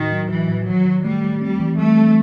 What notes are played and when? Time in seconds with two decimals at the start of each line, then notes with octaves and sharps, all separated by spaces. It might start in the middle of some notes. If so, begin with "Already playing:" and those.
Already playing: A2 D#3 F#4
0.12 F#3
0.30 E3 F#3
0.49 A2
0.67 D#3 F#3
0.86 D#3
1.04 G3 A3
1.24 A3
1.41 G3 C4
1.60 E3
1.79 G3 A3
1.97 C4